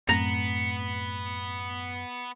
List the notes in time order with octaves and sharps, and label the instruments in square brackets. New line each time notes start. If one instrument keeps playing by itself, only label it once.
[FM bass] F#2 [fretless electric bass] A2 A3 C4 [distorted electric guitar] B3 [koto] A#5